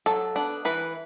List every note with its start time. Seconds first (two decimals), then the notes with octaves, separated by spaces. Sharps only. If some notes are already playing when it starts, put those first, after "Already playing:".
0.06 F#3 A4
0.36 B3 D4
0.65 E3 B4